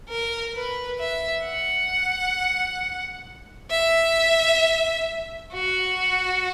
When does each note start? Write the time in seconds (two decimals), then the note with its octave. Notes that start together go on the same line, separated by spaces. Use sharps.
0.09 A#4
0.55 B4
0.99 E5
1.45 F#5
3.71 E5
5.53 F#4